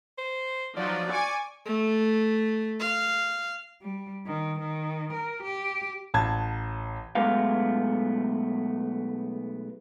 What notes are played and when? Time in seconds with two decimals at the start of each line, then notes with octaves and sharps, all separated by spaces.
0.18 C5
0.77 F3 F#3 D#4 D5
1.11 G#5 C#6 D6
1.66 A3
2.80 F5
3.82 G3
4.26 D#3
4.60 D#3
5.13 A#4
5.43 G4
6.14 A1 A5 G#6
7.15 B1 G#3 A3 B3 F5